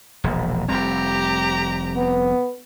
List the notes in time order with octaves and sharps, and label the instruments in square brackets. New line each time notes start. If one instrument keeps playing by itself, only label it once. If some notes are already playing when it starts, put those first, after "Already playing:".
[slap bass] E1 A#1
[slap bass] F1 G3 C4 [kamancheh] G4 A#5
[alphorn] B3